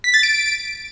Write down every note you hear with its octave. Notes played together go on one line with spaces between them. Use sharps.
B6
A6
D7